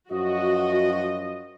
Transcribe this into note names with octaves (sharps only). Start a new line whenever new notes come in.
F#2 F3 F#4 D#5